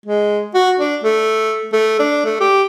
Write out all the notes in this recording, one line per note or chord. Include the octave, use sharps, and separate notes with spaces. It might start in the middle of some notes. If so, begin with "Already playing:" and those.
G#3
F#4
D4
A3
A3
D4
A3
G4